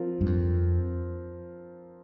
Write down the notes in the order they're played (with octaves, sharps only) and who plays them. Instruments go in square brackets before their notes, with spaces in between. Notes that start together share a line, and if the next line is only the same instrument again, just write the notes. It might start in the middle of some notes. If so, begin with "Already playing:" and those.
Already playing: [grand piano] F3 C4 F4 A#4
[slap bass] G2
F2